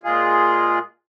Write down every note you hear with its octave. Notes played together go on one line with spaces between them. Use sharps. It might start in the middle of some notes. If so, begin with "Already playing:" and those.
A#2 G#3 F4 G#4